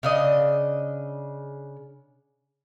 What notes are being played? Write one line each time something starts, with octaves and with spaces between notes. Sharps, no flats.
C#3 D4 D#5